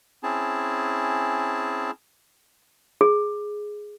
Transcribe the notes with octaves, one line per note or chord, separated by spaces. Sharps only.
C4 C#4 E4 G#4 A5
G#4